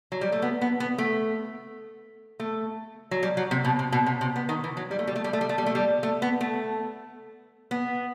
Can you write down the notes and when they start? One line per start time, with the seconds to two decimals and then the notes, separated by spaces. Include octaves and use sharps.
0.12 F#3
0.21 G3
0.32 A3
0.42 B3
0.61 B3
0.80 B3
0.98 A3
2.40 A3
3.11 F#3
3.23 G3
3.37 F#3
3.51 C3
3.65 B2
3.79 C3
3.92 B2
4.06 C3
4.21 C3
4.36 B3
4.49 D#3
4.64 E3
4.77 F#3
4.91 G3
4.99 A3
5.07 G3
5.16 A3
5.24 G3
5.33 A3
5.41 G3
5.49 A3
5.58 G3
5.66 A3
5.75 G3
6.03 A3
6.22 B3
6.41 A3
7.71 B3